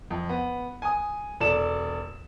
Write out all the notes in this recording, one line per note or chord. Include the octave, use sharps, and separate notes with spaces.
F2
B3
G#5 D#6
E1 A4 D5 E7